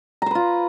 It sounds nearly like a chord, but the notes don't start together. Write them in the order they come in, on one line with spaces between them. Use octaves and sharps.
A#5 C5 B4 F4